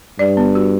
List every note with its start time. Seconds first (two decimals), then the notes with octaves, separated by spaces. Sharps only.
0.19 G2 D5
0.37 B3
0.55 F#4